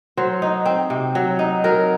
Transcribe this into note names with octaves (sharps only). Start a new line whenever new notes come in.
F#3 C5
D#4
C4
C3
F#3
D#4
F#3 A#4